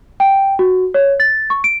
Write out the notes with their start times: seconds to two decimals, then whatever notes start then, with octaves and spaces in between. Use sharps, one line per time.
0.20 G5
0.59 F#4
0.94 C#5
1.20 A6
1.50 C#6
1.64 D7